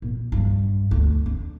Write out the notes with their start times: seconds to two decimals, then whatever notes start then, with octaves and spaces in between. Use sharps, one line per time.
0.02 A#2
0.32 G2
0.91 D2
1.26 D4